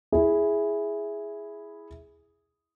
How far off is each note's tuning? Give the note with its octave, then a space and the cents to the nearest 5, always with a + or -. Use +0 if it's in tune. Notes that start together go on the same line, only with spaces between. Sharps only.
E4 +0 G#4 +0